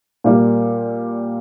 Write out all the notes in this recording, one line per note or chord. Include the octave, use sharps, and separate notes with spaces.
A#2 G3 A#3